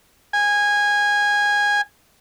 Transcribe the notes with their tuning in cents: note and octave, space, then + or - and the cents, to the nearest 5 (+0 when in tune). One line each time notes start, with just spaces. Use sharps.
G#5 -15